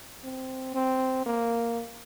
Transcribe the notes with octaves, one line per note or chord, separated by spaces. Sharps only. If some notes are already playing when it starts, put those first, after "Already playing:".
C4
C4
A#3